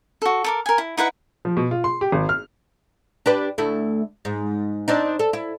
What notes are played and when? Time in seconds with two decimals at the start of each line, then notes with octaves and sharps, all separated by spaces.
0.22 F#4 A4
0.44 A4 A#4 D6
0.66 A#4 G#5
0.78 E4
0.97 D#4 E4 B4 F#5
1.45 F3
1.57 B2
1.71 F4
1.84 C6
2.01 G4
2.12 G#1
2.29 F6
3.26 D4 G4 B4
3.58 D2 A3 E4
4.25 G#2
4.88 C4 D4 D#4
5.19 A4
5.33 E4